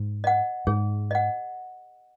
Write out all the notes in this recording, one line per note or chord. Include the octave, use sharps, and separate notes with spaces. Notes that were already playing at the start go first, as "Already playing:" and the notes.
Already playing: G#2
D#5 F#5
G#2 G#4
D#5 F#5